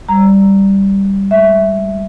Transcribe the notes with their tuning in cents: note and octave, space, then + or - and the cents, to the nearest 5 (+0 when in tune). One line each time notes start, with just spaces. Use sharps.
G3 +0 A#5 +0
G#3 +35 E5 +0